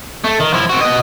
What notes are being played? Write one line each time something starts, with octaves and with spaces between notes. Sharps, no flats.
A3
D#3
F3 E4
C4 F#4
F#4 D#5